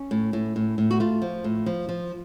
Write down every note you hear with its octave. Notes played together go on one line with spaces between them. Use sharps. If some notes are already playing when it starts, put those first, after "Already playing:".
Already playing: C#4
A2
A2
A2
A2
F#4
A3 F4
F3
A2
F3
F3